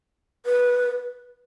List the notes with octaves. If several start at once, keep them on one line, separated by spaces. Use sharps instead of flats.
B4